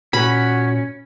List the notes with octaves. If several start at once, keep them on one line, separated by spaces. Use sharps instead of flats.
A#2 C#4 F#4 B5